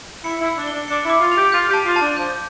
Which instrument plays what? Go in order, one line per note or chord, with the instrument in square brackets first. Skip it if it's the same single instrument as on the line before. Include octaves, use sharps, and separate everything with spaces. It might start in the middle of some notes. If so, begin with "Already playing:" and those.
[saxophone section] E4 [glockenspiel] C#7
[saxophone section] E4
[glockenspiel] E6
[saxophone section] D4
[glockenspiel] G7
[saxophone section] D4
[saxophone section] D4 [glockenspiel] C#7
[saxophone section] E4 [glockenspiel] D6
[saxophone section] F4
[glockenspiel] F7
[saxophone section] G4
[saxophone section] F4 [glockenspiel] G6
[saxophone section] G4
[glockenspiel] A5
[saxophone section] F4
[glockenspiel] A5
[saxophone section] D4
[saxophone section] F3 [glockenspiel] G6